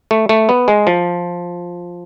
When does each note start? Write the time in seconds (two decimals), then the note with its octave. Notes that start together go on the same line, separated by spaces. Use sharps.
0.11 A3
0.29 A3
0.49 B3
0.68 G#3
0.87 F3